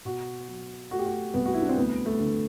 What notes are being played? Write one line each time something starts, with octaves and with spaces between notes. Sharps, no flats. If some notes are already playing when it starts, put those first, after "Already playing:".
B2 F#4
F#3
A3 F#4
G4
F#4
C2 B3
F#4
E4
D4
C4
D2 B3
A3
D3